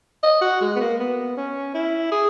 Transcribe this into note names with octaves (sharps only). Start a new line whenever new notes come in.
D#5
F#4
G#3
B3
A#3
B3
C#4
E4
G#4